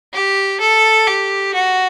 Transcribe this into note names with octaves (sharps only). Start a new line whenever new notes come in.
G4
A4
G4
F#4